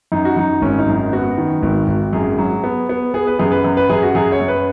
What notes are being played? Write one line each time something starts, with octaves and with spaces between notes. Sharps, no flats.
F#2 D#4
F#4
F#2 D#4
G#1 C#4
D#4
F#2
D#4
B3 F#4
D#3
G#1
G#1
F#2 G#4
F#3
B3
B3
B3 G#4
B4
F#2 G#4
B4
F#2
B4
F#2 G#4
F#4
F#2 G#4
C#5
F#2
B4